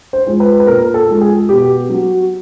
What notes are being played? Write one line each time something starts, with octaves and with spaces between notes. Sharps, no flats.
C5
F3 G#3
B4
B4
A#2 A#4
A4
F3 G#3
G#4
B2 G4
F#3